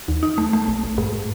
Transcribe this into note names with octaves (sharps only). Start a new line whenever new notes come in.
D#2
D#4
A3
A3
A1
A1
G#2